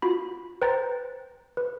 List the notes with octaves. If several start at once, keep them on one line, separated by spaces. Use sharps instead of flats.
F4 F#4 B5
B4 C5 G5 A#5 G6 A6
B4